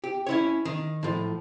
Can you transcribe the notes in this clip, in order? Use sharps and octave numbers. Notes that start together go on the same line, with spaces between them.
G4
C#4 E4 C#5
D#3
A2 F3